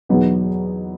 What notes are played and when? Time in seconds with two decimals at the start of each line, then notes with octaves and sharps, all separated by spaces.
0.09 E2 B2 F#3 B3 D#4